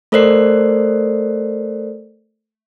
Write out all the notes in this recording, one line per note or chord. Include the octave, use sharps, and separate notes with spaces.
A3 A4 A#4 C5 D5 C7